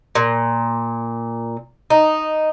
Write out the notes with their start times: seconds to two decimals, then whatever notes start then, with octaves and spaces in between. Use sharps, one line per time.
0.15 A#2
1.90 D#4